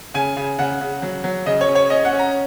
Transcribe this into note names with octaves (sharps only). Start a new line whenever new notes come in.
C#3 G#5
C#3
C#3 F#5
C#3
F#3
F#3
C#3 D#5
C#5
C#4
C#5
C#4 D#5
F#5
C#4
A#5